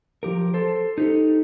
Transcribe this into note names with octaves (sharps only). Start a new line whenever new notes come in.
F3 G4 A#4
A4 C5
D#4 G4 A4